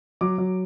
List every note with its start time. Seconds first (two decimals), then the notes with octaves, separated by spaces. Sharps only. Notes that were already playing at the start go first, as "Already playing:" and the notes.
0.21 F#3 D6
0.38 F#3